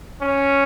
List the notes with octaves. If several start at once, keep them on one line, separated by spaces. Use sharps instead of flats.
C#4